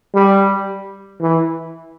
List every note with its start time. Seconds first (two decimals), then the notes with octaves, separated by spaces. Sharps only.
0.14 G3
1.21 E3